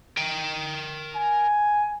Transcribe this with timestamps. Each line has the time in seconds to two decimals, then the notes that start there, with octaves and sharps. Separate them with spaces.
0.17 A#4 G5
1.16 G#5